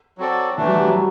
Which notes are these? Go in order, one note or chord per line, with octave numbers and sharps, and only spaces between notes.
F#3 C4 F#4 A4 D5
D3 E3 A3 D4
F#3
G3
F#3